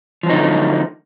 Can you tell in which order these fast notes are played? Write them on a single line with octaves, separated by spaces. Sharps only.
F3 F#3 D#4 D3 A3